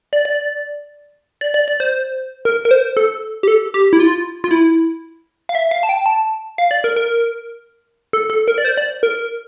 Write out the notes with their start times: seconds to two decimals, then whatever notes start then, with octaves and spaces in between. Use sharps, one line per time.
0.13 D5
0.25 D5
1.41 D5
1.54 D5
1.68 D5
1.80 C5
2.45 A#4
2.65 A#4
2.71 C5
2.97 A4
3.43 G4
3.48 A4
3.74 G4
3.93 E4
3.99 F4
4.44 F4
4.51 E4
5.49 F5
5.55 E5
5.71 F5
5.83 A5
5.89 G5
6.06 A5
6.58 F5
6.71 D5
6.84 A#4
6.96 A#4
8.13 A4
8.30 A4
8.48 A#4
8.58 D5
8.64 C5
8.77 D5
9.03 A#4